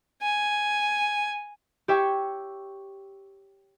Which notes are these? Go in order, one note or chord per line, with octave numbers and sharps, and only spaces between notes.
G#5
G4 C#5 E5 G5 C#6